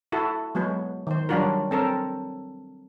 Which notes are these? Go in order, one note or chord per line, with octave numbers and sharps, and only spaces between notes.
E4 F#4 A4
F#3 G#3 B3 F#4
D#3 C5
F#3 G3 D4 F4 F#4 A#4
C4 A4 A#4 C#5